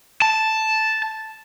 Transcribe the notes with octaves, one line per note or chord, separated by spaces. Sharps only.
A5